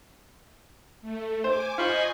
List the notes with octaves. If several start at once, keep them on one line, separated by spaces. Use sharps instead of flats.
A3
C5 G#5 D6
F4 C5 D#5 G#5 B5 C#6